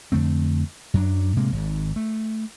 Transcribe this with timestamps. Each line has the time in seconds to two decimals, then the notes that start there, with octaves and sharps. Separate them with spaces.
0.12 F2 D3 A3 C4
0.94 F#2 F#3 D4
1.36 A2 C3 G#3 A#3
1.52 G#1 G#2
1.96 A3